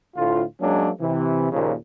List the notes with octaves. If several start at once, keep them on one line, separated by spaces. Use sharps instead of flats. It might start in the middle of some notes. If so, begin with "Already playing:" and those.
D2 A2 F4
F#3 G#3 A#3 C#4 D4
C3 E3
D#2 A#2 C#3 F3